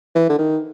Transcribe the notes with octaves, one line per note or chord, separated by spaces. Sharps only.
E3
D3
D#3